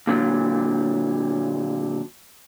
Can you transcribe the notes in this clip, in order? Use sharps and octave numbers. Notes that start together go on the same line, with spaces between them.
A#2 D3 F#3